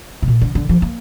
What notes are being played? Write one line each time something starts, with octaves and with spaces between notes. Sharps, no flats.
C3
A#2
D3
D3
F3
A#3